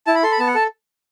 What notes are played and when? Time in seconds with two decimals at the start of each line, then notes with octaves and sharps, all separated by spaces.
0.07 E4 A5
0.15 B5
0.23 A4 C6
0.32 B5
0.39 B3 A5
0.47 F#5
0.55 A4 A5